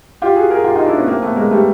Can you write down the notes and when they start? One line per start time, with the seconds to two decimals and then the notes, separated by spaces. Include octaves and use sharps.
0.22 F4 G4
0.36 F#4 G#4
0.50 G#4 A#4
0.64 F4 G4
0.75 D#4 F4
0.86 D4 E4
0.97 B3 C#4
1.08 A#3 C4
1.22 A3 B3
1.36 G#3 A#3
1.51 G3 A3